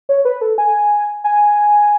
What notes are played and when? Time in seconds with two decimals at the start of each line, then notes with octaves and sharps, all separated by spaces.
0.09 C#5
0.25 B4
0.41 A4
0.58 G#5
1.24 G#5